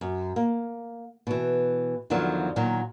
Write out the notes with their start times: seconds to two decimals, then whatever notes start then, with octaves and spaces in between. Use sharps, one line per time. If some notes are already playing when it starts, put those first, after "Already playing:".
0.01 F#2
0.36 A#3
1.27 B2 E3
2.10 E2 D3 D#3 F3 F#3
2.56 A#2 D#3 F#3